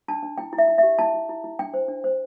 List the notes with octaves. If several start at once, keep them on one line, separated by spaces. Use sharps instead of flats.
D4 A5
D4
E4 G5
E4
E5
E4
G4 E5
E4 A5
E4
E4
E4
D4 G5
C5
D4
C5